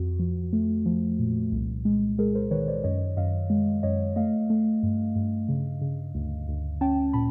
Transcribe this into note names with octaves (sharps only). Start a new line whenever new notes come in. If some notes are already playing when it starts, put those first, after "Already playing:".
Already playing: F2 F#4
F3
A3
F3
A#2
C2
G#3
G#3 G#4 A#4
A#4 C5
D#3 B4 C#5
C5 D5
F#2 C#5 D#5
F#2 D#5 F5
G#3
F#2 C#5 D#5
A3 D#5 F5
A3
G2
G2
C#3
C#3
D2
D2
C#4 G5 A5
A#2 A5 B5